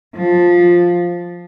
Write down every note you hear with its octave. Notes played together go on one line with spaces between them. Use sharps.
F3